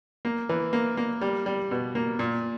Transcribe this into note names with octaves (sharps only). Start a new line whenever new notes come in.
A#3
E3
A#3
A#3
G3
G3
B2
A#3
A#2